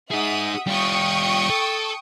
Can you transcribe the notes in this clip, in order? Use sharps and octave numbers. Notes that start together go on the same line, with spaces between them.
D#4 G#4 E5 F#5 D#6
G3 F4 G5 C#6 D#6
A4